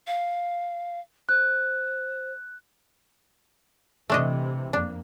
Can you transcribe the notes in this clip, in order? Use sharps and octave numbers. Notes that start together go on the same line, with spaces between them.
F5
C5 F#6
C3 E3 A3 D4 D#5
F2 A#3 D4